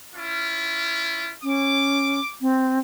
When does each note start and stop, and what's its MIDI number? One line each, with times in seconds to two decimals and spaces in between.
0.14 1.32 61
0.14 1.32 64
0.14 1.32 65
1.43 2.20 61
1.43 2.33 86
2.41 2.79 60